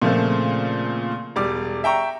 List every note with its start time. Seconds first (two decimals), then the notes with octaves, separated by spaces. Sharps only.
0.02 A#2 C#3 F3 A3 A#3 C4
1.36 E1 G3 D5 D6
1.84 E5 G5 A#5 C#6